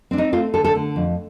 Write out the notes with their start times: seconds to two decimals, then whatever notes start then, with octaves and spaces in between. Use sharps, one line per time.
0.11 C4 D4
0.18 D#4
0.33 A3 F4
0.54 D3 A4
0.65 A4
0.75 D3
0.96 F2